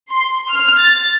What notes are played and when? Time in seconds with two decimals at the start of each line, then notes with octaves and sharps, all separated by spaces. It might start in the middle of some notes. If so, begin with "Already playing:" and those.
0.12 C6
0.50 F6
0.80 A6